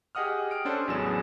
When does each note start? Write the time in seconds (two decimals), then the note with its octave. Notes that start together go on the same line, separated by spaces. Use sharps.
0.15 G4 G#4 D#5 F#5 D#6 F6
0.51 F6 D7
0.65 C#4 D4 A4 C5
0.88 A1 E2 F#3 B3 G#4 E7